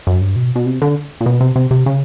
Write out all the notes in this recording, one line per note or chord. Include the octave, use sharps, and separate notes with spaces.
F#2
G2
B2
B2
C3
D3
A#2
B2
C3
C3
C3
C#3